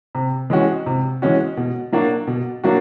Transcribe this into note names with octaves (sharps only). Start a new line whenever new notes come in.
C3
E3 G#3 C#4 F#4
C3
E3 G#3 C#4 F#4
B2
F#3 A#3 D4 F#4
B2
F#3 A#3 D4 F#4